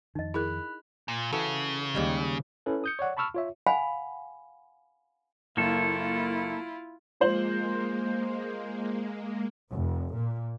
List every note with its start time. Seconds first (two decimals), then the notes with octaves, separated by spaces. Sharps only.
0.15 F2 D#3 D#4 D#5
0.34 E4 G#4 A#4 B5 F#6
1.08 A#2
1.33 C#3 E3 F#4 A4
1.95 D#2 G3 G#3
2.66 C#4 E4 A4 B4
2.84 D#6 G6 C#7
2.99 C#5 D5 F#5
3.17 A5 B5 C#6 E6 F6
3.34 F4 C#5 E5
3.67 F5 F#5 G#5 B5
5.57 F#1 A#3 E4 F4 A4
7.20 F3 G#3 A#3 C5 F#7
9.72 F1
10.14 A#2